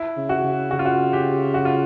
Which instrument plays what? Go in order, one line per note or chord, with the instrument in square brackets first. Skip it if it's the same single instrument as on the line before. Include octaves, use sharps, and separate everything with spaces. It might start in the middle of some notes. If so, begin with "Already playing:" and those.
Already playing: [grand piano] E4
[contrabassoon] C#3
[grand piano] F#4
[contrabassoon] C#3
[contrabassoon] C#3 [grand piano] F#4
[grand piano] F4
F#4
G4
F#4
F4